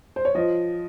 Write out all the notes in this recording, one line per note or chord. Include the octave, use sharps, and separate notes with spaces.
C5
C#5
F3 D#5